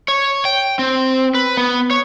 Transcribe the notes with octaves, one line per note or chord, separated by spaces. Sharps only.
C#5
G5
C4
B4
B3
C#5